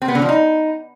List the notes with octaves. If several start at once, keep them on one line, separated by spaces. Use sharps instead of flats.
C4
B3
D3
F3
D#4